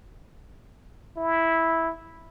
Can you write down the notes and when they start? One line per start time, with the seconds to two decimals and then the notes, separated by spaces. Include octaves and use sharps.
1.17 E4